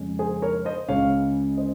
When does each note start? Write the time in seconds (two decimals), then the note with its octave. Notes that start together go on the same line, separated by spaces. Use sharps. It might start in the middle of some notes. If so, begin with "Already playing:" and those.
Already playing: F2 C#3 G#3 C#4
0.19 G#4 C5
0.42 A#4 C#5
0.65 C5 D#5
0.88 C#2 C#3 G#3 C#5 F5
1.57 C5 D#5